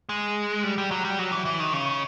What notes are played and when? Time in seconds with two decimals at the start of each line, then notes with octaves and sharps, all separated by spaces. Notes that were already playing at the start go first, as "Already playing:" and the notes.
0.09 G#3
0.64 G3
0.78 G3
0.91 F#3
1.05 G3
1.19 F#3
1.32 E3
1.45 E3
1.60 D#3
1.73 C#3